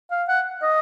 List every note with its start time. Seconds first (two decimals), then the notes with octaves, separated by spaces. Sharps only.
0.11 F5
0.28 F#5
0.63 D#5